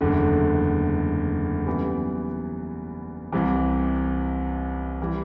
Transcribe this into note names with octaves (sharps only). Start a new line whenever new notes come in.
F#1 E2 D3 A3
F#2 E3 G3 B3
C2 C3 E3
E3 G3